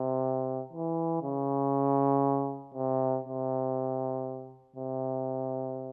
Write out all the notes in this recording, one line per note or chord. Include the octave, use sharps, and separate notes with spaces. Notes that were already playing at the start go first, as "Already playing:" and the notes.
Already playing: C3
E3
C#3
C3
C3
C3